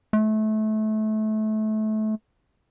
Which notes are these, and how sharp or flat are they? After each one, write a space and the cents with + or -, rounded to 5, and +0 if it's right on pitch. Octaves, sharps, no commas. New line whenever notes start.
A3 -25